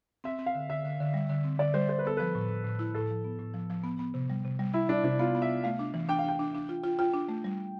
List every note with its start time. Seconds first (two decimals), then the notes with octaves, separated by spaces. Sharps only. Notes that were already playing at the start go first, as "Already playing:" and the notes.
0.24 C4 E5
0.39 C4
0.46 F5
0.55 D3
0.70 D3 E5
0.85 D3
1.00 D3
1.14 G3
1.30 D3
1.44 C4
1.59 D3 D5
1.74 G3 C5
1.89 D3 C5
1.99 B4
2.05 B3 A4
2.17 F3 B4
2.35 A2
2.50 A2
2.64 A2
2.79 E4
2.95 A2 A4
3.10 F3
3.24 B3
3.39 A2
3.54 F3
3.70 F3
3.84 B3
3.99 B3
4.14 C3
4.30 G3
4.45 C3
4.59 G3
4.74 G3 E4
4.89 G3 D4
5.04 C3 D4
5.19 B3 F4
5.35 B3
5.42 E5
5.49 B3
5.64 A3 F5
5.79 D4
5.94 E3
6.09 D4 G5
6.19 F5
6.24 D4 G5
6.39 D4
6.55 D4
6.69 F4
6.84 F4
6.99 F4 G5
7.13 D4
7.29 A3
7.44 G3